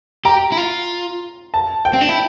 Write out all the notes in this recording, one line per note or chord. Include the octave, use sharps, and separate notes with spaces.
G4 A#5
E4
F4
A5
G5
C4
D4
E4